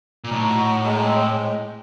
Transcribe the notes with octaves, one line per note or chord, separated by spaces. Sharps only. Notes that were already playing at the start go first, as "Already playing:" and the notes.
A#2
A2 D#4
F#4
D#4
G#3
C4
G#3